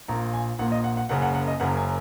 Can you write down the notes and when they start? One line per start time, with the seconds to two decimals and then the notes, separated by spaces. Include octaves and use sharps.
0.08 A#1 A#2 A#5
0.34 G#5
0.59 A#1 A#2 F#5
0.72 D#5
0.84 F#5
0.97 F#5
1.09 F#1 F#2 C#3 F#5
1.22 F#5
1.35 F#5
1.48 D#5
1.60 F#1 F#2 C#3 F#5
1.77 G#5